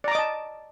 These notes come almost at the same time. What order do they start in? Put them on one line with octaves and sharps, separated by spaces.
D5 A#5 D6 D#5 A5